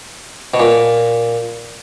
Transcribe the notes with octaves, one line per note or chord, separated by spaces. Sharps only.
B2
A#2